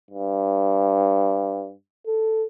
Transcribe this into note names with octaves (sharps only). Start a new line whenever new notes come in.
G2
A4